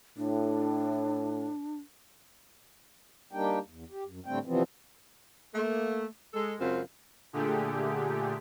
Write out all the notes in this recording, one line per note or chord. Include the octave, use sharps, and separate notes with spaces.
A2 D4
G3 A#3 D4 D#4 G4 G5
E2
G4
F#2
A2 D3 G3 A3 C4 G5
C3 E3 F3 G3 B3 C4
A3 A#3
G#3 A4
F#2 C#3 G#3 C4 F4
A#2 D3 A3 G4 G#4